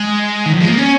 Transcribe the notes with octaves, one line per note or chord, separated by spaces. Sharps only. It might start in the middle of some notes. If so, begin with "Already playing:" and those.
Already playing: G#3
D#3
F3
G#3
A#3
C#4